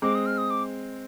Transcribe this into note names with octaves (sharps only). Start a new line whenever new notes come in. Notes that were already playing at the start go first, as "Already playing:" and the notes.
G#3 C4 D6
D#6
F6
D#6
D6